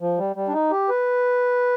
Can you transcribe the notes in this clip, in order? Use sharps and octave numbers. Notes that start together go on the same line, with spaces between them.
F3
G3
G3
D4
D#4
G4
B4